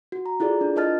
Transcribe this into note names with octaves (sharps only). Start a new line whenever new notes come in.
F#4
A#5
E4 F4 G#4 A4 D5
D4
F4 A#4 D#5 A5 F6 A6